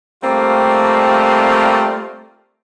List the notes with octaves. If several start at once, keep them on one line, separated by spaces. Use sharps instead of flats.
G3 A3 A#3 C4 F4